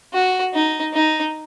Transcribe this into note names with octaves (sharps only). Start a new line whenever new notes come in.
F#4
D#4
D#4